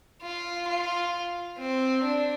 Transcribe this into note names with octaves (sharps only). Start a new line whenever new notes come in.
F4
F4
C4
D4